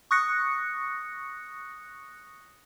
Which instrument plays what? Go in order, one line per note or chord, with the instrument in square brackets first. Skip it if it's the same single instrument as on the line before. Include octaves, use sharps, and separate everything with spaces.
[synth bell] C#6 D#6 F#6 A#6 C#7